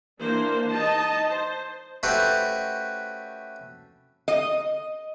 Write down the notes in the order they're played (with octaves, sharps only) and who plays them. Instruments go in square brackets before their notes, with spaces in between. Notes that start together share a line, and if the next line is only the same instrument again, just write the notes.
[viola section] E3 A#3 D4 C5
D#4 D#5 A5
C5
[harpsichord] A3 C#4 F#4 G4 B4 C5
[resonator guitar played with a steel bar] D#5